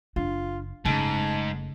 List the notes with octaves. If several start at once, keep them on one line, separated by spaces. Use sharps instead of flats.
F#1 D4 F4
F#1 G#2 C#3 A3 A5